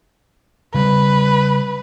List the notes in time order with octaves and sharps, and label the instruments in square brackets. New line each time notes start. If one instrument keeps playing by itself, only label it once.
[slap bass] C#3 G3 [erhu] B4